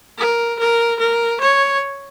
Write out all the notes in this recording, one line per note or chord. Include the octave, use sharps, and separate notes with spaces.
A#4
A#4
A#4
C#5